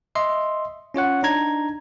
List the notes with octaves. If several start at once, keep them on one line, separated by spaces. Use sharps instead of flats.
D#5 E5 C6
C#4 F4 C#5 F#5
D4 D#4 A#5 G#6